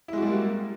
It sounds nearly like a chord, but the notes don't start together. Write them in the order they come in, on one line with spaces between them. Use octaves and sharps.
E4 G#3 F#4 G3 A#3